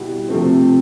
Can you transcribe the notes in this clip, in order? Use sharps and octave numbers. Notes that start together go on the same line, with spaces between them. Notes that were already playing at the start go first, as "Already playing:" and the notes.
Already playing: B2 G3 B3 E4
C3 F3 A3 C4